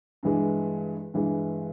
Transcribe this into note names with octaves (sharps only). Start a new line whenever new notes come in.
G2 E3 G#3
G2 E3 G#3